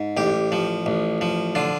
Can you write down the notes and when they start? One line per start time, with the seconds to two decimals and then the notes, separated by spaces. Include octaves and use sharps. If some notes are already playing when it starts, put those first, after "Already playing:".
Already playing: G#2
0.17 A1 G4
0.52 F3
0.86 A1
1.21 F3
1.55 D3 F4